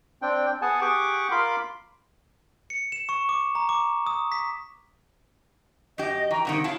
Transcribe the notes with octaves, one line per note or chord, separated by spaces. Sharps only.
C4 D4 G5
B3 G#4 F#5 G#5 A5
G4 G#4 F#5 C#6 D6
F4 A#4 B5 C6 D6
C#7
E7
C#6
D6
A#5
D6
D#6
B6
F#2 G4 D#5
E3 G5 A#5 C#6
G2 C3 D#3 F#5
F#3 E4 F5 A5